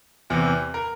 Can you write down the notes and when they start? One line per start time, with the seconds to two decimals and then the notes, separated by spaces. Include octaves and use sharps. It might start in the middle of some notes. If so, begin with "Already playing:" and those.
0.30 E2 C3 E3
0.74 A#4